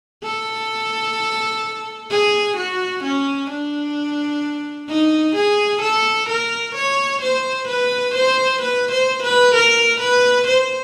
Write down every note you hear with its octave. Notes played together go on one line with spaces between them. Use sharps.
A4
G#4
F#4
C#4
D4
D#4
G#4
A4
A#4
C#5
C5
B4
C5
B4
C5
B4
A#4
B4
C5